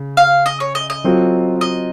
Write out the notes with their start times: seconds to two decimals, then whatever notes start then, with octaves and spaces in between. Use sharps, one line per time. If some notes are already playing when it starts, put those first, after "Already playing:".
Already playing: C#3
0.17 F5
0.46 D#5
0.60 C#5
0.75 D#5
0.90 D#5
1.04 F#3 C4 F4 A4
1.61 D#5